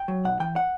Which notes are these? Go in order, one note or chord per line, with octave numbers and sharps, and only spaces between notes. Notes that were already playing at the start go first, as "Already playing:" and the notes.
Already playing: G5
F#3
B1 F#5
E3 G5
F#5